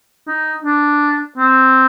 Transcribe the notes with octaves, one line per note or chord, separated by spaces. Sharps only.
D#4
D4
C4